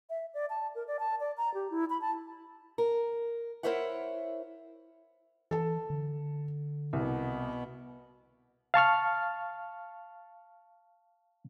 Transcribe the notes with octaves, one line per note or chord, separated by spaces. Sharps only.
E5
D5
A5
A#4
D5
A5
D5
A#5
G4
E4
B5
A5
A#4
E4 A#4 C5 C#5 E5 F#5
E3 A4 A5
D3
C2 B2 B3
F5 A5 C#6 F6